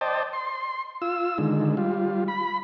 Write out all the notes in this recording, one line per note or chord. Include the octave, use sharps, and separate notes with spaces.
C5 D5 D#5 G5 A5
C6
F4 E6
D3 D#3 G#3
G3 F4
B5